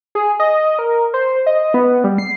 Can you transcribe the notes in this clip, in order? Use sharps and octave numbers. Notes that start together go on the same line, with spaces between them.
G#4
D#5
A#4
C5
D#5
B3
G3
C7